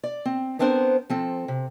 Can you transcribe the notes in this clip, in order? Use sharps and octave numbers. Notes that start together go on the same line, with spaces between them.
D5
C4
B3 C4 D4 A#4 C5
F3 C4 A4
C3